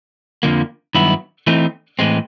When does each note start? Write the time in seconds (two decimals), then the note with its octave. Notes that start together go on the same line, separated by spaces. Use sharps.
0.43 F2 D3 F3 A#3
0.95 G2 D#3 F#3 B3 E4
1.47 E3 A3 C4 D#4
1.99 A2 E3 G#3 C4